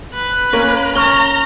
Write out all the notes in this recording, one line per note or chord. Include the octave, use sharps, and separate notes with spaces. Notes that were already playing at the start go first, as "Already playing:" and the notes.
B4
A#3 C#4 A#4
C#4 A#5 C#6 F6 G7